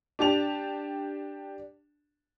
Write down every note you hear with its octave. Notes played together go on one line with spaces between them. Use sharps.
D4 G4 A5 F7